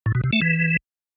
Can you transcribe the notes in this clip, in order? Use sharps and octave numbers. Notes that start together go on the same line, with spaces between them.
A2
B2
C3
A3
E3